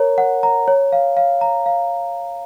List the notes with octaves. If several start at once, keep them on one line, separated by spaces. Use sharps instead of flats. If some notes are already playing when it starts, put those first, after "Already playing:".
Already playing: A#4 C#5 A#5
F#5
A#5
C#5
F5
F5
A#5
F5